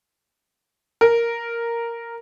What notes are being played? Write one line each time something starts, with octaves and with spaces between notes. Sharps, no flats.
A#4